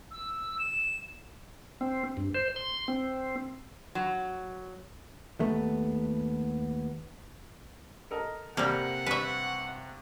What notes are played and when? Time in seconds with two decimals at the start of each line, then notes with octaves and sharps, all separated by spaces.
0.11 E6
0.59 E7
1.81 C4
2.17 G2
2.35 C5
2.56 C6
2.88 C4
3.95 F#3
5.40 D#2 A3 B3
8.11 A4 A#4 D#5
8.57 C3 G3 A#3 F#5
9.06 G2 B4 E5 C#6